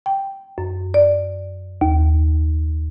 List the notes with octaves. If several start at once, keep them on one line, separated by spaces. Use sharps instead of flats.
G5
F#2
D5
D#2